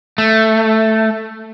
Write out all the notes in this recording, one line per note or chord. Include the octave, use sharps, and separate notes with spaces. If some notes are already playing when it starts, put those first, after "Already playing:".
A3